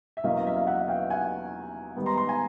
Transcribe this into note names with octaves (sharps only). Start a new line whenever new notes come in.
E5
E2 B2 F#3 A#3 C#4 D#5 F5
D#5
E5
F5
E5 F#5
F5 G5
F#5 G#5
G#2 D#3 G3 B3
A#5 C6
A#5 C6
G#5 A#5